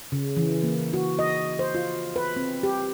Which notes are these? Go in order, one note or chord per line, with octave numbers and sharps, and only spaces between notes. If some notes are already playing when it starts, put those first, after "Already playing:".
C#3
E3
A#3
F#4
D#5
C5
F4
B4
C4
G4